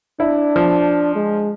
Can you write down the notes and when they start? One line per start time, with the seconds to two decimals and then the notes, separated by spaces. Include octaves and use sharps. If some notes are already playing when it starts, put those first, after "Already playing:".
0.20 D4 E4
0.56 F3
1.15 G#3